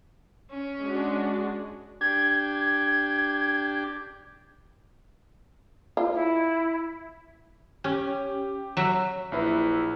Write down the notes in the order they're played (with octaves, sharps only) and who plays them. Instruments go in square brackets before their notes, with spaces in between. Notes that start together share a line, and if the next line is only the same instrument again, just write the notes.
[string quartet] C#4
[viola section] G#3 D4 F#4
[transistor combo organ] D4 G4 [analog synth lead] G#6
[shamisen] F4
[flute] E4
[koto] C#4 [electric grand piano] G4
[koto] F#3 E5
[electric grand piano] A#1 E4 B4